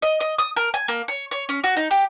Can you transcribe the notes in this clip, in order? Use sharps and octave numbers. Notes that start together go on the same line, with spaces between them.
D#5
D#5
D#6
A#4
G#5
A#3
C#5
C#5
C#4
F#4
D#4
G4